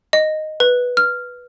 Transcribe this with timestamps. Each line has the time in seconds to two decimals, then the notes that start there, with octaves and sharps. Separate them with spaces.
0.13 D#5
0.60 B4
0.97 F6